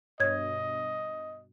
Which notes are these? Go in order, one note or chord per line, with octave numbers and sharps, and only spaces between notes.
G2 B2 C#5 D#5 G#6